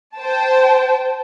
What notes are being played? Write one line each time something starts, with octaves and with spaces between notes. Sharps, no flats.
C5 G5 A5